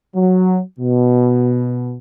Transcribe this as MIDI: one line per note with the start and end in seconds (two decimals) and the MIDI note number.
0.15 0.59 54
0.79 1.96 47